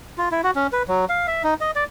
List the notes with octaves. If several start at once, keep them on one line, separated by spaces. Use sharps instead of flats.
F4
E4
F#4
C#4
B4
F#3
F5
E5
D#4
D#5
D5